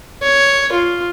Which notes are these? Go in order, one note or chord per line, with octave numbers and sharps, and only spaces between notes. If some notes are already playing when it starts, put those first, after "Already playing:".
C#5
F4